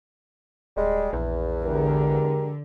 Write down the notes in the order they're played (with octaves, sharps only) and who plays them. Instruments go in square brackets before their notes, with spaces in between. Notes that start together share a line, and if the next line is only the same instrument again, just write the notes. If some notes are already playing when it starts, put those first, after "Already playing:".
[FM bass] D1 [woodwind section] G3 G#3
[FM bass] A#1 [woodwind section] E2
[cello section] D3 [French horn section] G#3 G4 A#4